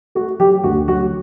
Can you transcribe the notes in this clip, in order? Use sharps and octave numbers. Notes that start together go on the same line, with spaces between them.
A3 F#4
F#3 G4
D2 F#4
F#3 F#4